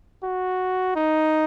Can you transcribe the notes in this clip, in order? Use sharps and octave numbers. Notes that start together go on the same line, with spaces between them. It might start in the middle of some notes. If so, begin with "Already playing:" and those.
F#4
D#4